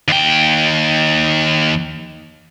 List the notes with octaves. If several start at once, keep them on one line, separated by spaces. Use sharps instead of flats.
D#2 G5